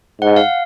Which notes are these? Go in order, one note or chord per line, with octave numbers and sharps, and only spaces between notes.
G#2 F#5
F5